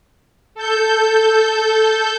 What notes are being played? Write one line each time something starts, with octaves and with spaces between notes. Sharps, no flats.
A4 G6